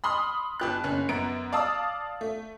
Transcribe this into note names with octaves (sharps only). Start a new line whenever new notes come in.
B5 C6 D#6 F6
G1 G4 F#6
F#1 C#4 F#6
F#2 B3 A#5 D7
D5 F5 A5 D#6 E6
A3